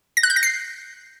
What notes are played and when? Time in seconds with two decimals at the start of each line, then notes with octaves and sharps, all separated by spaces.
0.17 A#6
0.23 F#6
0.30 G6
0.36 A#6
0.43 C7